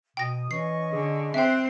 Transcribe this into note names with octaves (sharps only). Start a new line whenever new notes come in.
B2 G5 D#6 A#6
E3 C#4 D#5 C#6 C7
D3 G#4
C4 C5 E5 G5 F#6